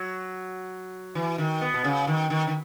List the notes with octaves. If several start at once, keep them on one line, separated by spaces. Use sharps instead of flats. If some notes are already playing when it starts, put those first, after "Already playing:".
Already playing: F#3
E3
D#3
B3
B2
C#3
D#3
D#3
D#3